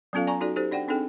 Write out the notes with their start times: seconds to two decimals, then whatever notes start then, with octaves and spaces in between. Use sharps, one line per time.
0.13 F#3 B3 C#4 F4 A4 F5
0.27 D5 G#5 A#5 C#6
0.41 D#4 F#4 A4 D5
0.56 D#4 G4 A4 C5
0.71 D4 D5 F#5 G5
0.88 C4 D4 D#4 G#4 A4 G5